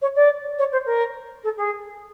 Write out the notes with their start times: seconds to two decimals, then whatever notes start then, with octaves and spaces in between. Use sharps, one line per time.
0.01 C#5
0.15 D5
0.58 C#5
0.72 C5
0.85 A#4
1.43 A4
1.57 G#4